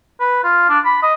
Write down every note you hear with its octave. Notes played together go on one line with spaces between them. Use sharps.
B4
F4
D4
B5
D#5